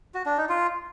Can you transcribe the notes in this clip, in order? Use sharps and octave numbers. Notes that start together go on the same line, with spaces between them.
F#4
D4
D#4
F4